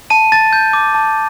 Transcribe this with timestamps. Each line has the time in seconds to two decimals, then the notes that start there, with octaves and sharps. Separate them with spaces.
0.10 A5 D#7
0.32 A5 A6
0.53 G6
0.73 D6
0.95 A5